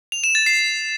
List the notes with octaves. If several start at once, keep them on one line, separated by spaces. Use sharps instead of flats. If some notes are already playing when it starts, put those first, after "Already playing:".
F7
E7
A6
C7